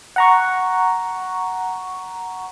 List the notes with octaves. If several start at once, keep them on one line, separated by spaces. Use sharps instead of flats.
F#5 A#5 C#6